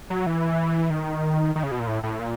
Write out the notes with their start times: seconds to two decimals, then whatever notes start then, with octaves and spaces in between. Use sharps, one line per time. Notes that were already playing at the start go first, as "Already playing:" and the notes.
0.10 F#3
0.26 E3
0.90 D#3
1.56 D#3
1.63 C#3
1.71 B2
1.80 A#2
1.87 A2
2.03 A2
2.19 A#2